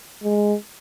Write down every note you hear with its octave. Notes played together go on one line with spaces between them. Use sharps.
G#3